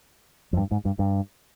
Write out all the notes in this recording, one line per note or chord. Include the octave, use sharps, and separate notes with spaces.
F2
G2
G#2
G2
G2